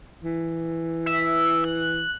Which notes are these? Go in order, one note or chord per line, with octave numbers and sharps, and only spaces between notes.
E3
E5
F#6